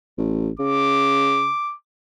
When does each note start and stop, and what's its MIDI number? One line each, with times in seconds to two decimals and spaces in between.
0.18 0.49 33
0.59 1.50 49
0.59 1.75 86